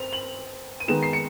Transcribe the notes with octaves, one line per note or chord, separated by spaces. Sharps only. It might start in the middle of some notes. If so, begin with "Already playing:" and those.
Already playing: C4 F7
F#7
D#7
D#3 G#3 B3 D#4 E7
C7
C#7